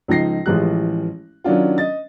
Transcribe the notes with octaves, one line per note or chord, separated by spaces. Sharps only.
C#2 F3 D#4 A#6 C7
A1 E3 F3 G#3 G4 F#6
D#3 F#3 C#4 D4 F4
D#5 A6